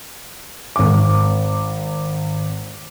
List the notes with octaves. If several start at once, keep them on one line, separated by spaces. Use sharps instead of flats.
G#1 D6